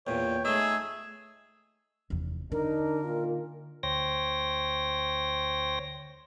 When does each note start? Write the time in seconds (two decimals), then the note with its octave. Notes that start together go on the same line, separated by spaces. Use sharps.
0.07 E2 A#2 C#5 G5
0.45 A3 D#4 G#4 E6
2.10 F1 E2
2.52 D3 D4 D#4 A#4
3.04 A#2 D#3 F4
3.83 D2 C5 C#5 G5 A#6